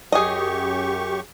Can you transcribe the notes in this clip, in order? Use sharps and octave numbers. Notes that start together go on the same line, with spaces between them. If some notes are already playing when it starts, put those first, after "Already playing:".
F#2 G4 G#4 D#5 C#6